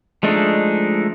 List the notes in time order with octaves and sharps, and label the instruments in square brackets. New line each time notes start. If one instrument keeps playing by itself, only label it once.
[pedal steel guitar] F3 G#3 A3 D4 D#4